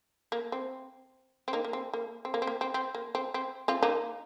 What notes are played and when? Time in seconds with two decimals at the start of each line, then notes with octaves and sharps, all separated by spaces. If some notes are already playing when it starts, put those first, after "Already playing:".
0.32 A#3
0.52 C4
1.48 C4
1.53 A#3 D#4
1.64 A#3
1.73 C4
1.93 A#3
2.25 C4
2.34 A#3
2.42 C4
2.47 A#3
2.61 C4
2.74 C4
2.95 A#3
3.15 C4
3.34 C4
3.68 C4 F4
3.82 A#3 D#4